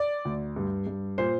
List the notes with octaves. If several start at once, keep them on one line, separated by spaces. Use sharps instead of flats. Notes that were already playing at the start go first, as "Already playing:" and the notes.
Already playing: D5
D2
G2
G2
A#2 C5